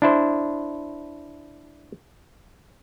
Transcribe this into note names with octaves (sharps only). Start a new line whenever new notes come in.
D4 E4 C5